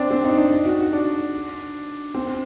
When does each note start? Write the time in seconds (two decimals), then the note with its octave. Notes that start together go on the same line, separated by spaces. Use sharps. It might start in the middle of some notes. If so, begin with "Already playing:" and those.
Already playing: C4 D4
0.11 C4
0.25 D#4
0.38 D4
0.52 D#4
0.65 F#4
0.79 F#4
0.93 D4
2.14 C4